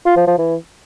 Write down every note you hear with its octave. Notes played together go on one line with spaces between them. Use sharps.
F4
F3
F3
E3